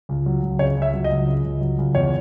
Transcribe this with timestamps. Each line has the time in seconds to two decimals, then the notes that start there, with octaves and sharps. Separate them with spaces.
0.09 C#2
0.26 F#3
0.42 C#2
0.59 C#3 C#5
0.77 C#2
0.82 E5
0.94 F#3
1.04 D#5
1.10 C#2
1.28 C#3
1.44 C#2
1.61 F#3
1.78 C#2
1.95 E2 C#5